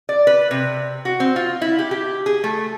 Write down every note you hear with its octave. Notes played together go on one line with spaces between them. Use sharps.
D5
B4
C3
F#4
C4
F4
E4
G4
G4
G#4
A3